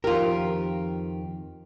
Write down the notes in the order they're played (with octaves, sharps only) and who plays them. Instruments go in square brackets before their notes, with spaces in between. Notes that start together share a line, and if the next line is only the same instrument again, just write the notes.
[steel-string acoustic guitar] F2 D#3 G4 [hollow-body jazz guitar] F4 A#4